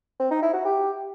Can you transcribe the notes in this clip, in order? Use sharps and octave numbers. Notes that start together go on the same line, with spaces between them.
C4
D#4
E4
F#4
G4